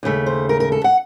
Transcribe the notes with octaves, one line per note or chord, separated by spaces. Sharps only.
D#2 C#3 A3
C5
A#4
A#4
A4
F#5